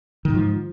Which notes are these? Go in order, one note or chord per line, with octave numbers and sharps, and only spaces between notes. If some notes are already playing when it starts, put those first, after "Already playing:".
G#2 D#3 F3